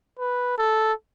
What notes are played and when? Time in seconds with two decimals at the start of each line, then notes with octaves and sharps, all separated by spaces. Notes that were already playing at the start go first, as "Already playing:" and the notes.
0.19 B4
0.58 A4